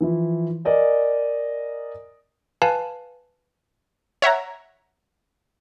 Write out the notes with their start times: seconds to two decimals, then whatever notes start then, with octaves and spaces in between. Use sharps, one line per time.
0.01 E3 F3 E4
0.65 A#4 D5 D#5 G#5
2.62 B4 F5 G#5 A5
4.22 C#5 E5 F#5 A#5